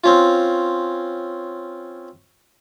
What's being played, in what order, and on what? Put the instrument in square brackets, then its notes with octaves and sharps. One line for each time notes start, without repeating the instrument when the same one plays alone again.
[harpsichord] C4 C#4 F4